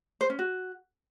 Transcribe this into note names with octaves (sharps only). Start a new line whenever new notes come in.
C5
C#4
F#4